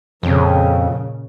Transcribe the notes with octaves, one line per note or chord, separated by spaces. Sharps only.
F2 A#2 C#3